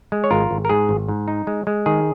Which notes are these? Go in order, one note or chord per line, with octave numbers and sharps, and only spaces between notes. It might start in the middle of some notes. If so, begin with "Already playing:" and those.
G#3
C#5
G#1 F4 A#4
G#1
A#4
G#2 G#4
G#1
G#2
D#4
G#3
G#3
D#3 G#4